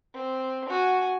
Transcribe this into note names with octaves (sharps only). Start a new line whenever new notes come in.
C4
F#4 G#5